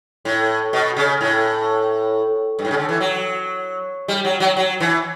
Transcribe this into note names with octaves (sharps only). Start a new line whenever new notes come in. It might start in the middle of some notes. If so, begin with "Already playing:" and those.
A2
B2
C#3
A2
G2
A2
C#3
D3
E3
F#3
G3
F#3
F#3
F#3
E3